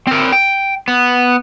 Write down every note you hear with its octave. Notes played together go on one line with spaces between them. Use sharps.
C4 A#4
G5
B3